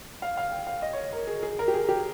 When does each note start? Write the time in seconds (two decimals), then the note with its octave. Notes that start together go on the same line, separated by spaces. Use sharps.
0.22 F5
0.37 F5
0.52 G5
0.67 F5
0.82 D#5
0.93 C#5
1.13 A#4
1.27 G#4
1.43 G#4
1.59 A#4
1.68 G4
1.74 G#4
1.89 G4